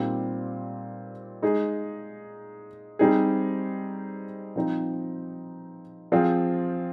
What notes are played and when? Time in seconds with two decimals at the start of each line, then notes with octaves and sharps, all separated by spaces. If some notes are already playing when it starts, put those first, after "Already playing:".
Already playing: A#2 G3 C4 D#4 G4
1.42 G#3 D#4 G#4
2.99 G3 C4 D#4 G#4
4.56 F3 C4 D#4
6.12 F3 C4 F4 G#4